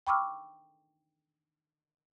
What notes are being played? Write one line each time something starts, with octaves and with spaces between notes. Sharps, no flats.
G5 B5 C#6 D6 E6 F6